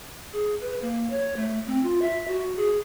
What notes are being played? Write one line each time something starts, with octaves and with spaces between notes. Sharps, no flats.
G#4
B4
A#3
C#5
A3
C4
F4
E5
F#4
G#4